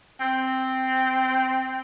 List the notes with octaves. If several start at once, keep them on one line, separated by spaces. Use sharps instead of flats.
C4